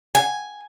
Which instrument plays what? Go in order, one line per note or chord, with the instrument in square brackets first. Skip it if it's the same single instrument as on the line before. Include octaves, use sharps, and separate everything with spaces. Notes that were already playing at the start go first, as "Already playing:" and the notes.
[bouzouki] G#5